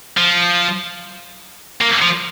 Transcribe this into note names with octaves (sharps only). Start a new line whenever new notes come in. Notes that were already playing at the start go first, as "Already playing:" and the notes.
F3
A#3
F3